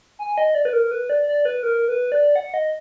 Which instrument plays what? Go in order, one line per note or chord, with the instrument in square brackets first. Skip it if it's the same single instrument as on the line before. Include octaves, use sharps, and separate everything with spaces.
[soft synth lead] G#5
D#5
D5
B4
A#4
B4
D5
D5
B4
A#4
B4
D5
F#5
D#5